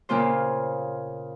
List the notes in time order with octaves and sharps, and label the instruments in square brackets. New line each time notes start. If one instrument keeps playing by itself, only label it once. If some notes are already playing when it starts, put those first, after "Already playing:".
[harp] A#2 C#3 A#3 F4 C5